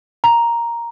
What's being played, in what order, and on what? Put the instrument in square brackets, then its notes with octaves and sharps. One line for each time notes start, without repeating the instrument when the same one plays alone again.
[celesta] A#5